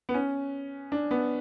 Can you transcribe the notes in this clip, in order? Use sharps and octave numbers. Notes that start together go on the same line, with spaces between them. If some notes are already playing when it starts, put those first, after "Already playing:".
B3
C#4
D4
B3